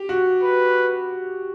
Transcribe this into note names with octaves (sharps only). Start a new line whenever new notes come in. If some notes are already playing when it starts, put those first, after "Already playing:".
Already playing: G4
F#4
B4